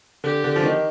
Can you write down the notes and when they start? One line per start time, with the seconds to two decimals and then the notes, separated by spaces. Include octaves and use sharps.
0.24 D3 G4
0.44 D3
0.56 F3
0.63 D#3